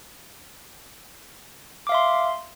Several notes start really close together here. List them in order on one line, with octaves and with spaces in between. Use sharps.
D6 F5 E5 C6